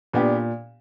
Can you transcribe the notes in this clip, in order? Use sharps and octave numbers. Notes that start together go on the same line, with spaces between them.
A#2 B3 D4 G4